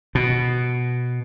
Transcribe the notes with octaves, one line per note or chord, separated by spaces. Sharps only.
B2